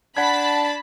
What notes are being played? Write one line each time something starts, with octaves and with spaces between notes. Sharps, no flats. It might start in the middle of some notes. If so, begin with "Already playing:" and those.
D4 F#5 A5 B5 G#6